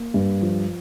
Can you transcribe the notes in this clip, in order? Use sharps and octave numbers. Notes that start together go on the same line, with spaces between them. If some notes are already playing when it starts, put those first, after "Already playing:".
Already playing: A#3
G2
F3